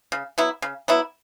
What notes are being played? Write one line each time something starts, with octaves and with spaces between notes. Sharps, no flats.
C#3
F#3 B3 E4
C#3
F#3 B3 E4